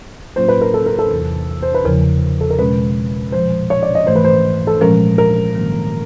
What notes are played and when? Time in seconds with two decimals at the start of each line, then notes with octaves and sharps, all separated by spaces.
0.36 A2 F#3 A#3 C#4 F4 C5
0.48 B4
0.61 A#4
0.74 A4
0.86 A#4
0.99 A4
1.10 E2 C3 E3
1.62 C5
1.74 B4
1.85 E2 C#3 F3 A#4
2.41 A4
2.50 A#4
2.59 E2 B2 G#3 C#4 B4
3.32 A#2 F3 G#3 C5
3.70 C#5
3.83 D5
3.95 D#5
4.06 G#2 E3 A3 C5
4.15 B4
4.24 C5
4.67 A4
4.81 A#2 F3 G#3 C#4 A#4
5.18 A#4
5.55 G#2 D#3 F#3 A#3